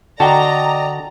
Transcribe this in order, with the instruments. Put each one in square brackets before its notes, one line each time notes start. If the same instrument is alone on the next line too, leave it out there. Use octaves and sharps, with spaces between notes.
[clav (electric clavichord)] D3 F#4 [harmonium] D5 D#5 [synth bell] G5 A5 [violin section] A#5